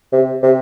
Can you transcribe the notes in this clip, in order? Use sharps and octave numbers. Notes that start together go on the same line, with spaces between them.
C3
C3